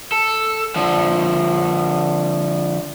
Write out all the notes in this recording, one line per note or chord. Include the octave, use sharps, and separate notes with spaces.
A4
D3 F3